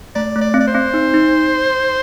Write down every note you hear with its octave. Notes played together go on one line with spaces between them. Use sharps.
A3 D5
A3
D5
C4
D5
C5
C4
D#4
D#4